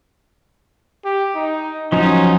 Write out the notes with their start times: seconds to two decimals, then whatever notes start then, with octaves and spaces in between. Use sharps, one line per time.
1.05 G4
1.35 D#4
1.92 F3 F#3 C#4 D#4